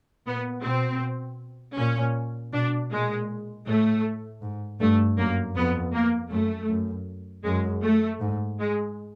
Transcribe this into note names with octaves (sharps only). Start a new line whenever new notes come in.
A#2 B3
B2 C4
A#2 C#4
B2 D4
A#2 G#3
A2 A3
G#2
G2 A3
F#2 A#3
F2 B3
A#3
F#2 A3
F#2
F#2 G#3
A3
G#2
G#3